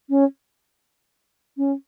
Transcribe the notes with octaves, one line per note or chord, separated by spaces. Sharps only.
C#4
C#4